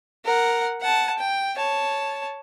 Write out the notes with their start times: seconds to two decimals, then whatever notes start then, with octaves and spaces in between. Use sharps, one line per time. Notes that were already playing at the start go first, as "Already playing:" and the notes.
0.25 A#4 F#5
0.81 F#5 A5
1.18 G5
1.56 C#5 A5